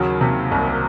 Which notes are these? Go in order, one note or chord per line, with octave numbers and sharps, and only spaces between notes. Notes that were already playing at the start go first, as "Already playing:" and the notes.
Already playing: D#2 C#3 F#3
C3
C2